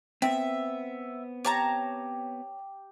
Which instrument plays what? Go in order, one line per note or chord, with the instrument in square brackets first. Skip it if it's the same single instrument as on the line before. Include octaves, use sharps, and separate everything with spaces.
[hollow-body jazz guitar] B3 C4 [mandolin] E5 [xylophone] G5
[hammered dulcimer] G4 [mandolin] C#5 A5 A#5